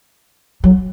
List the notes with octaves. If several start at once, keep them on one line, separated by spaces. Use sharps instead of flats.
F#3